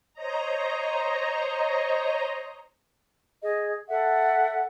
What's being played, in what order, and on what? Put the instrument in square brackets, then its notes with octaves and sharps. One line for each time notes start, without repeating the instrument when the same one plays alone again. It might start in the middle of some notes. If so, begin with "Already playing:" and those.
[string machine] C5 C#5 D#5 A#5
[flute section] G#4 D#5
A4 E5 F#5